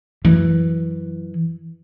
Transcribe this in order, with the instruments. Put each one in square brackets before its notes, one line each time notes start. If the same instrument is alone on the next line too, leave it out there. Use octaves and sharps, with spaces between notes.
[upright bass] F#2 E3